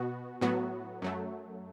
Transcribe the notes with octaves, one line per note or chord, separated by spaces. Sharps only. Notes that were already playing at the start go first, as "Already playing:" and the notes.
Already playing: B2 B3 F#4
A2 F#3 B3 F#4
F#2 F#3 A3